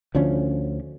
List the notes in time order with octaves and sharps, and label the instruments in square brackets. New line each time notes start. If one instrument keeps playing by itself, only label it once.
[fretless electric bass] D2 D3 F3 C#4